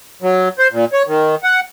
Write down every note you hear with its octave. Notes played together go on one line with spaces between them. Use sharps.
F#3
C5
A#2
C#5
D#3
F#5